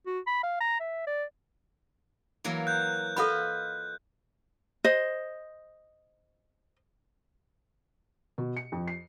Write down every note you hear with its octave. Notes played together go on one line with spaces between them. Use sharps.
F#4
B5
F5
A#5
E5
D5
E3 F#3 A#3
F#6 G6
F4 A4 B4 D#5 F#5 B5
C5 D#5
B2
C#7
F2
C7